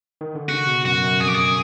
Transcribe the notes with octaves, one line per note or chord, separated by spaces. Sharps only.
D#3
D3
C#3 F#4
B2
F#2 F#4
F#2
F2 G#4
G4
G#4